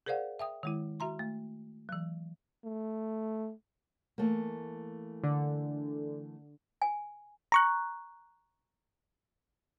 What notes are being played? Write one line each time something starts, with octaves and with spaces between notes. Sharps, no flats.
G#4 A#4 C5 D5 F5 F#5
E5 G5 D#6
D#3 G#3 E4
F#4 E5 A#5 C6
A3
E3 F#3
A3
E3 A3 A#3
D3
G#5
A#5 C#6 F#6